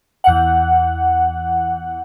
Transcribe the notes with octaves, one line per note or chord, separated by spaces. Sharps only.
E2 F#5